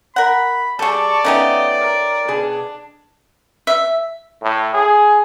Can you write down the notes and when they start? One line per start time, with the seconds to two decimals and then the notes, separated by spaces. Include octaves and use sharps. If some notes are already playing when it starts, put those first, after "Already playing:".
0.16 A#4 F#5 B5
0.79 G3 G#4 A4 D5 A5 C#6
1.25 A3 B3 C#4 D#4 G4 D#5
1.79 A#4
2.28 B2 D4 G#4
3.67 E5
4.43 A2
4.74 G#4